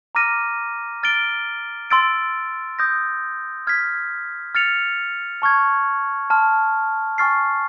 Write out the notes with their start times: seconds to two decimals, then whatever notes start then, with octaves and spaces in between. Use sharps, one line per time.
0.15 A#5 D6 F6 A#6 D#7
1.03 F6 A6 D7 G7
1.90 C6 E6 A6 D7
2.79 D#6 G6 A#6
3.67 F6 G#6 B6
4.55 F6 A6 C#7 F7
5.42 A5 C#6 F6 G#6
6.30 A5 C6 F6
7.18 G#5 C#6 F6 A6 C7